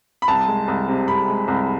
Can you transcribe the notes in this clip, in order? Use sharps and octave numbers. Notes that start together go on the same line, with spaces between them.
B5
C2 A5
G#3
C2
C3
C2 B5
G#3
C2